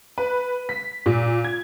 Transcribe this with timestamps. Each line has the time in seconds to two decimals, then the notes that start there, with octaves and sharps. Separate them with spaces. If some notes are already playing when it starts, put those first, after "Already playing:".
0.18 B4
0.69 B6
1.06 A#2
1.44 G#6